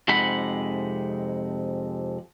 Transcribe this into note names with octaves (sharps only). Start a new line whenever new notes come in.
F2 C3 G#3 D#4 F#5 B5